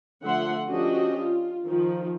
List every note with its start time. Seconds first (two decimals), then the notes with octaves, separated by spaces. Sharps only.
0.22 D3 F3 A3 E5 F#5 C6
0.68 F3 C#4 D4 F#4 G4 D#5
1.19 F4
1.67 D#3 F3